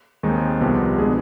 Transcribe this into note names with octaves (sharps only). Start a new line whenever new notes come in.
D#2 D#3 G#3 C4 D#4
C2 C3 F3 B3
B2 G#3 B3 D4 G#4